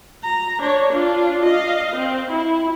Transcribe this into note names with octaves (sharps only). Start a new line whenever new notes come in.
A#5
D4 C#5
D4 F4
D#5 F5
C4
E4